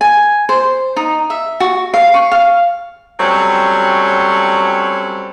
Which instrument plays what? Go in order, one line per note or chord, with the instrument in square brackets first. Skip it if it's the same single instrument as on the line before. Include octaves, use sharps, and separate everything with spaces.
[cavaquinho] G#5
C5
D#4
E5
F#4
F5
C#6
F5
[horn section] F#3 G3 A3 C4 C#4